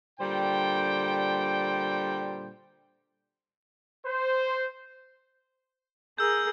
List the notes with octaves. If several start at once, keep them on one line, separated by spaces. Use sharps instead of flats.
A#2 D3 G3 C5 G5
C5
G#4 A#4 E6 G6